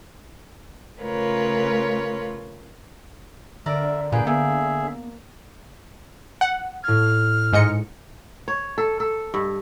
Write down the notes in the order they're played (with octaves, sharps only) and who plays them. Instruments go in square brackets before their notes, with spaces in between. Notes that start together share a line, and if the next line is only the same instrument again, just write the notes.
[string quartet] C#3 A3 F4 A#4 B4 C#5
[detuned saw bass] D3 [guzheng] A#4 D5 [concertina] E5
[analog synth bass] A#2 [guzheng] A#3 G5 [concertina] G#4 B4
[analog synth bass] B3 [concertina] G#4 E5
[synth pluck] F#5
[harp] A2 G#6 [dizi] F6
[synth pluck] G#2 D#5 C#7
[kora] C#5
A4
A4
G2